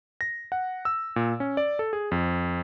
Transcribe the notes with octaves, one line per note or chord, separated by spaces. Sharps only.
A#6
F#5
E6
A#2
C#4
D5
A4
G#4
F2